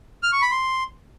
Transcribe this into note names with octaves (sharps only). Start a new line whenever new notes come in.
F6
C#6
B5
C6